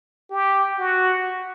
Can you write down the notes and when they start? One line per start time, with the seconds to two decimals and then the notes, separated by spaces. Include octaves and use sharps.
0.31 G4
0.79 F#4